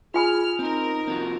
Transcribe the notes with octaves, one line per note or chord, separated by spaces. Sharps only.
F4 G#4 G#5 B5 F6
C4 D#4 A#4
C4 F4 F#4